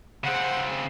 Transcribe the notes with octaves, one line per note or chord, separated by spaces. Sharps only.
C#3 C4 G#4 C5 F#5